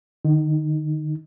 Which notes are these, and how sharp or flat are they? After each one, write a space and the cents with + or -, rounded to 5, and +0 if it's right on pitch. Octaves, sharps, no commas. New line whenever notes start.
D#3 -45 D#4 +0